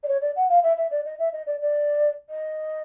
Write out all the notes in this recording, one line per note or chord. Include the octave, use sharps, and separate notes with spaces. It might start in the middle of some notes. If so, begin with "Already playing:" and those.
D5
C#5
D5
F#5
F5
E5
E5
D5
D#5
E5
D#5
D5
D5
D#5